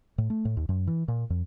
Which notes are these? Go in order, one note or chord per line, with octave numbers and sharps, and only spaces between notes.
A2
A3
A2
D#2
F#2
E3
A#2
F2